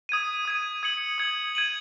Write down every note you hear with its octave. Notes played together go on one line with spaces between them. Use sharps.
D#6 G#6 D#7
D#6 G#6 D#7
D#6 G#6 C#7 F#7
D#6 G#6 C#7 F#7
G#6 D#7 F#7